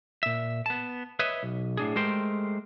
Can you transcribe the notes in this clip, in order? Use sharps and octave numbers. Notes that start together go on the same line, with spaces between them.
A#2 E5
B3 A5
B4 C#5 D#5 E5
B1
A2 D4 G#4
G#3 A3 G4 A#4 C5 G5